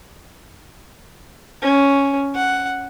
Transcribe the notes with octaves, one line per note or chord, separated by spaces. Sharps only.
C#4
F#5